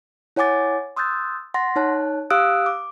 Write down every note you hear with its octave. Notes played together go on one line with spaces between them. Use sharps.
E4 C#5 F#5 G#5 D6 A6
C6 D#6 E6 F#6 G6 A6
F#5 C6 A6 A#6
D#4 C#5 A5 F#6
G4 F5 D#6 E6 F#6 D7
D6